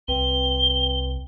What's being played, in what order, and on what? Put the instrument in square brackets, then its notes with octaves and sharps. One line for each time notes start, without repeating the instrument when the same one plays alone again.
[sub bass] C2 [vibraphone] C4 B4 G5 [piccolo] G7